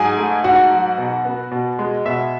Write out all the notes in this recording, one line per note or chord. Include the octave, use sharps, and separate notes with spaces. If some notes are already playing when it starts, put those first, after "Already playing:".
Already playing: G#2 F#3 G#4 G#5
A3
G#2 F#4 F#5
F#3
B2
B3
B2
G#3
B2 E5